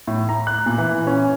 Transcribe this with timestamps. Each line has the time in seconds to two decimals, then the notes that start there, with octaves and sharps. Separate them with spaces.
0.07 A2
0.29 A#5
0.47 F#6
0.66 A#2
0.78 E3
1.07 C#4